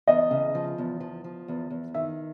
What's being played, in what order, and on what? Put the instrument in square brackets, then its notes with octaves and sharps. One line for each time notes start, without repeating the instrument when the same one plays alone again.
[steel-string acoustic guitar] E2 [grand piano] D#5
[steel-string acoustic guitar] C#3
F3
E2
F3
F3
E2
E2
[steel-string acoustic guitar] D#3 [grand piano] E5